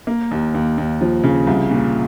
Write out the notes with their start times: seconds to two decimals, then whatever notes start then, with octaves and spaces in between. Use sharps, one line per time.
0.07 A#3
0.31 D#2
0.54 D#2
0.78 D#2
1.01 F3
1.23 C#3
1.47 C2
1.71 A#2